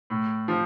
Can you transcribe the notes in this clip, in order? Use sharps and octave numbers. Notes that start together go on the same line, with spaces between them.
A2
F3 C4